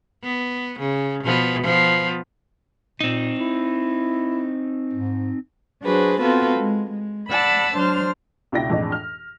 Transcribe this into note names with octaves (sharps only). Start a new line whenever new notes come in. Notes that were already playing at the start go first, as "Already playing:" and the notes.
B3
C#3
B2 F3 B3
F3 B3
A#2 C4 D#4
E4
G#2
F#3 D4 F#4 G#4 B4 C5
B3 C4 F4 F#4 A4 B4
G#3
G#3
D5 F#5 A5 B5 E6
F#3 D4 C5 C6 F6
C#2 B2 D4 E4 G5 A#6
F2 A2 E3 G#3 D4 D#4
F6